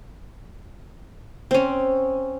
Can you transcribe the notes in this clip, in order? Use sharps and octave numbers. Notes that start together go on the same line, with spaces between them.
C4 C#4